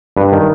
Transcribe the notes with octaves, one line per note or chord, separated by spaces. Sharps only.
G2 B4
D#3